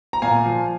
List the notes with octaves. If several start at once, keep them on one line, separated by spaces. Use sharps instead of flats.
A#5
A#2 F5 G#5
F3